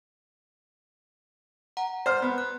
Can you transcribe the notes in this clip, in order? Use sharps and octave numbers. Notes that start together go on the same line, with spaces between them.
F#5 A#5
C5 F6
B3
F#6